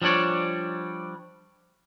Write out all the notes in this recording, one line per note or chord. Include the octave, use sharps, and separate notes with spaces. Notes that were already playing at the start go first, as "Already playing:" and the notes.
F3 G3 D4 C#5 D5